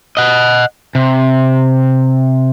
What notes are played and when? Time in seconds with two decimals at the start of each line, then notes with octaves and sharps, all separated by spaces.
0.17 D#5 F#5
0.95 C3